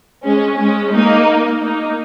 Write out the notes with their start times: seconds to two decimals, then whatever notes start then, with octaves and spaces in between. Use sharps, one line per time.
0.24 G#3 C#4
0.59 G#3 C#4
0.93 A#3 D#4
1.61 A#3 D#4